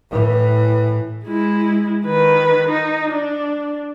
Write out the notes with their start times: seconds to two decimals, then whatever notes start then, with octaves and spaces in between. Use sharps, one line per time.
0.10 A2 E3
1.25 G#3 E4
2.05 D#3 B4
2.69 D#4
3.10 D4